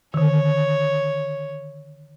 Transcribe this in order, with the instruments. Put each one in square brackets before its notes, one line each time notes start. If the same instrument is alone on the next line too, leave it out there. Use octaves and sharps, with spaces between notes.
[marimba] D3 D#3 [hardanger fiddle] C#5